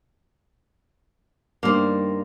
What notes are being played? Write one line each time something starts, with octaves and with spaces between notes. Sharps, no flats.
G2 D#3 G3 A#3 C5